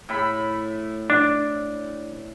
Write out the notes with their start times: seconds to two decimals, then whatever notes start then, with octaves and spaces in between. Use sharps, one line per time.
0.09 A2 E5 B5
1.10 D4